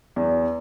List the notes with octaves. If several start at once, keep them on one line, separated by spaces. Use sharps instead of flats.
E2